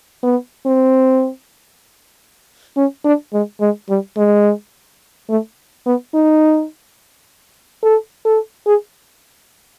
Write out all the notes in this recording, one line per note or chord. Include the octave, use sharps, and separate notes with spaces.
B3
C4
C#4
D4
G#3
G#3
G3
G#3
A3
B3
D#4
A4
A4
G#4